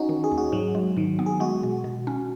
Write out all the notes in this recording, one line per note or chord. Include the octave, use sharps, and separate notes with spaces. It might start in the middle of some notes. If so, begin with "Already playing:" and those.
Already playing: C#4 D#4 F#4
D#3
G#4
D#2
F#4
G#2 F#3
G#3
G#2 D#3
B3
G#4
G#3 F#4
B2
B2
C#4